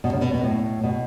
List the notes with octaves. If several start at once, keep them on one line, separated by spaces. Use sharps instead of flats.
B2
C#3
B2
B2
A2
B2